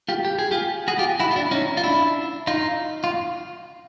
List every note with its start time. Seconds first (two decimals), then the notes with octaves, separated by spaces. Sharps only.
0.09 F4 G4
0.25 G4
0.39 G#4
0.51 F4 G4
0.88 F#4 G#4
0.99 F4 G4
1.20 E4 F#4
1.31 F4
1.36 D4 E4
1.51 C#4 D#4
1.77 F4
1.84 D4 E4
2.47 D#4 F4
3.04 F4